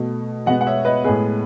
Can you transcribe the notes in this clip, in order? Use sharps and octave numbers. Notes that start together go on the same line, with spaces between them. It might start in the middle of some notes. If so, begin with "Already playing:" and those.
Already playing: B2 A3
B2 G#3 B3 D#5 F#5
F#5
C#5 E5
B4 D#5
A2 G#3 B3 G#4 B4